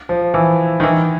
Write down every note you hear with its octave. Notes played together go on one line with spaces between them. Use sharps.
F3
E3
D#3
E3